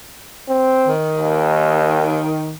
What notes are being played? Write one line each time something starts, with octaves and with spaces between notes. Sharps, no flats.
C4
D#3
D#2